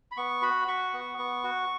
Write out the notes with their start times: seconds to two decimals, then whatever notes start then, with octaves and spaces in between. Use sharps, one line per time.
0.11 B5
0.17 B3 C#6
0.42 F#4 B5
0.68 F#4 C#6
0.93 B3
1.18 B3
1.44 F#4